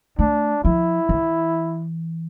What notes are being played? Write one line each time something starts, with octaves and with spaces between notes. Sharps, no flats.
A3 D4
F3 E4
E3